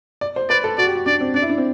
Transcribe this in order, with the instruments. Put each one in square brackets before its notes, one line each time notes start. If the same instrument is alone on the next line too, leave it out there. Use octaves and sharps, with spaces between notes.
[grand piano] D5
C5
[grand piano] B4 [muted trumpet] D5
[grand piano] A4
[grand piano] F#4 [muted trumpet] D5
[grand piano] G4
F#4
[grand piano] D4 [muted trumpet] D5
[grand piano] C4
[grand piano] D4 [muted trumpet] D5
[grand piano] E4
D4
C4